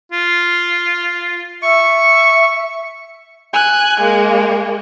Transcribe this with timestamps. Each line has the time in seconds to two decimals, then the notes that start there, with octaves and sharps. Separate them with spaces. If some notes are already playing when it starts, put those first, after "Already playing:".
0.12 F4
1.63 E5 C#6
3.54 G#5 F#6
4.00 G#3 A#3